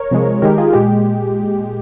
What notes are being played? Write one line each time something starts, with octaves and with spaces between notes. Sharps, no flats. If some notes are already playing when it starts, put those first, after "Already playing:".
Already playing: A#4 C#5
C3 F3 G#3
D#3 G#3 G4 A#4
F4 G#4
A#2 G#3 G4